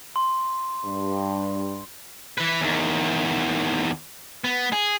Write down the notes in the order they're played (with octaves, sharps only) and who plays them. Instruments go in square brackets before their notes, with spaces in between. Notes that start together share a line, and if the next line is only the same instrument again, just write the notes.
[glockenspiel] C6
[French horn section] G2
[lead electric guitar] E3 B4
E2 D#3
B3
G#4